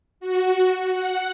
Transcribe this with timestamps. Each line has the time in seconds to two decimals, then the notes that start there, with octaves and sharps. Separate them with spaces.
0.20 F#4
0.92 F#5